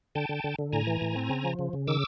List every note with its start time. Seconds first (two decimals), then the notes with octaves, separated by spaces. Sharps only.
0.15 D3 G5 A5
0.29 D3
0.44 D3
0.59 D3
0.73 A2 G#5 A#5
0.87 E3
1.01 A2
1.16 C4
1.30 C#3
1.44 F3
1.59 C#3
1.73 C#3
1.87 D#3 D6 E6